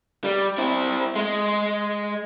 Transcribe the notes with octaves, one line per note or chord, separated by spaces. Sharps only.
G3
C4 E4
G#3